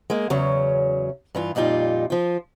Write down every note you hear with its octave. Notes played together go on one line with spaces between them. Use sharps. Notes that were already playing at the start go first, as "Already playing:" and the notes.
G#3 A#3
E2 C#3 F#3 C#4
G2 E3 F4
F2 A#2 G3 D#4 F4
F3 F4